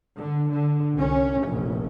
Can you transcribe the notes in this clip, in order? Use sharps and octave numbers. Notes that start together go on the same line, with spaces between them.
D3
D3
C2 C#4
F1 A#1 A2